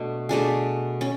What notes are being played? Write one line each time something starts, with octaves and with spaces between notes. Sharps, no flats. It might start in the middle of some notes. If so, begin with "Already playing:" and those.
Already playing: B2 A3 D4
B2 A3 D4 G#4
C#4